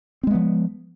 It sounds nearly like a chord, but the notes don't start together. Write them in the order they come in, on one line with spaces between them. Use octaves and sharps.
C4 G#3 B3 F3